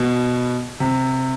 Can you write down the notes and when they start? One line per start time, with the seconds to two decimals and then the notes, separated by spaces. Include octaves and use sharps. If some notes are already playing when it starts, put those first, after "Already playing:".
Already playing: B2
0.80 C3